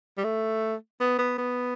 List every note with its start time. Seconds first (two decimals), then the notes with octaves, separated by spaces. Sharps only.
0.18 G3
0.24 A3
1.00 B3
1.19 B3
1.38 B3